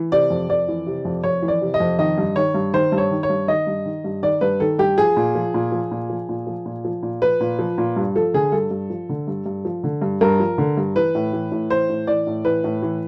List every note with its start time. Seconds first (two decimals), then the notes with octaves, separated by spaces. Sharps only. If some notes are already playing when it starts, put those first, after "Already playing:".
Already playing: E3
0.12 C3 D5
0.30 F2
0.49 F2 D5
0.68 E3
0.86 C3
1.05 F2
1.23 F2 C#5
1.42 E3
1.48 D5
1.61 C3
1.74 D#5
1.80 F2
1.99 D#3 D#5
2.18 G2
2.36 D#3 C#5
2.54 G2
2.73 D#3 C5
2.92 G2
2.98 C#5
3.11 D#3
3.23 C#5
3.29 G2
3.48 D#3 D#5
3.67 G2
3.86 D#3
4.04 G2
4.23 D#3 D5
4.41 G2 B4
4.60 D#3 A4
4.79 G2 G4
4.98 F3 G#4
5.17 A#2
5.35 F3
5.54 A#2
5.72 F3
5.91 A#2
6.10 F3
6.29 A#2
6.47 F3
6.66 A#2
6.85 F3
7.03 A#2
7.22 F3 B4
7.41 A#2
7.59 F3
7.78 A#2
7.96 G2
8.16 F3 A4
8.34 D3 G#4
8.52 G2 A4
8.71 G2
8.90 F3
9.09 D3
9.27 G2
9.46 G2
9.65 F3
9.84 D3
10.02 G2
10.21 G2 A#4
10.39 F3
10.58 D3
10.77 G2
10.96 E3 B4
11.15 A2
11.33 E3
11.52 A2
11.70 E3 C5
11.89 A2
12.07 E3 D5
12.27 A2
12.45 E3 B4
12.64 A2
12.82 E3